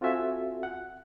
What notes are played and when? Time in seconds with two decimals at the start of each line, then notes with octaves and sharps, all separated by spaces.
0.01 C4 F4 F#4 A4 E5 G#5
0.63 F#5